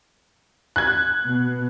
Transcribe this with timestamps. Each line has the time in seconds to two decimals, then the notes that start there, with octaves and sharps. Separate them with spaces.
0.76 F#6 G#6
1.27 B2